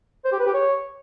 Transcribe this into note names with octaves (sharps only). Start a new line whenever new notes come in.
C5
G4
B4
G4
C#5